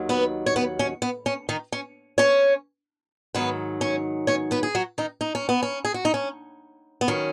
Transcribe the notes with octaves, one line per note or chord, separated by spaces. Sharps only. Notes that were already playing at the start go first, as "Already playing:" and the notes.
Already playing: D#2 D#3 F#3
B3 B4
C#5
B3 B4
C#4
B3
C#4
D#3 D#4
C#4
C#4 C#5
G#2 D#3 F#3 B3 B4
C#4 C#5
C#4 C#5
B3 B4
G#4
F#3 F#4
D#3 D#4
D#4
C#4
B3
C#4
G#4
F#4
D#4
C#4
B3
D#3 F#3 C#4